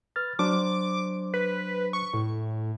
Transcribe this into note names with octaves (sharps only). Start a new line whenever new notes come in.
B4 F6 A6
F#3 D4 C5 D6
B4
C#6
A2